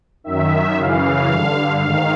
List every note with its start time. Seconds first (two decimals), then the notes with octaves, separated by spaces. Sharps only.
0.24 F#2 D#3 E5
0.76 F#2 C#3 E3 F5
1.29 G2 D3
1.81 G#2 D#3 F5